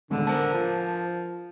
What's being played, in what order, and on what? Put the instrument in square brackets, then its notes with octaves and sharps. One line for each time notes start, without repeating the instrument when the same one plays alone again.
[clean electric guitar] D#2 G#3 B3 [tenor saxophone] D3
[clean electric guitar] A#4 C5 A5
[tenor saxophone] F3